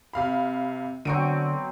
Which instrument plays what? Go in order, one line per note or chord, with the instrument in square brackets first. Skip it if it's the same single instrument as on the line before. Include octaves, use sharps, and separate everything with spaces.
[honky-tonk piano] C3 F5 B5
[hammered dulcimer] B2 F#3 C4 [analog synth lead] D3 [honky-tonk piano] C#6 D7 D#7